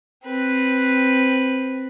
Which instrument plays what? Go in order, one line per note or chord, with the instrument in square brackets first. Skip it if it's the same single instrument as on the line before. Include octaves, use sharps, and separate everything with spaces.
[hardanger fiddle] C4 B4